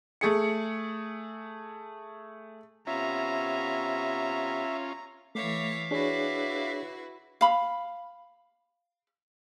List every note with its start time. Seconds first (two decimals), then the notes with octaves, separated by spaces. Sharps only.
0.21 A3 G#4 C#7
2.87 C3 B3 C#4 F4 E5 G#5 A#5
5.35 E3 A3 C#5 E5 F5 D6
5.91 D4 E4 F#4 G#4 B4 C#5
7.41 F5 B5